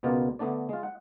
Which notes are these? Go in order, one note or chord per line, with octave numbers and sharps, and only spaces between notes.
C#2 B2 B3 F4 A#4 D5
D3 A3 B3 D4 D5
G#3 F4
F#5